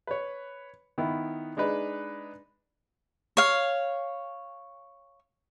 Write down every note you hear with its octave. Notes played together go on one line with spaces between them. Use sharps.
B4 C#5
D#3 B3 E4
G#3 D4 D#4 B4
C#5 F5